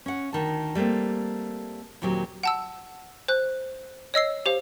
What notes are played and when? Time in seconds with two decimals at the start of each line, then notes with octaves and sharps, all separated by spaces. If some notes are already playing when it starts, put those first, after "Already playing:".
0.06 C#4 F#5
0.33 D2 D#3 A5
0.75 G3 A3 A#3 C4
2.02 D#2 A#2 F#3 C4 G4
2.43 F#5 A5 E6
3.28 C5 F#6
4.14 C#5 D#5 E6 C7
4.46 G4 C5 F5